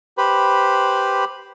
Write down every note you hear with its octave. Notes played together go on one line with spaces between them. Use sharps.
G4 B4 C5 B5